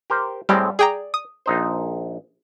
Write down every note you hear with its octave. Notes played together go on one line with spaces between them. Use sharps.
G4 A#4 C5
A2 G3 G#3 C4
G#4 D5 G5 A#5
D#6
A#1 D#4 C5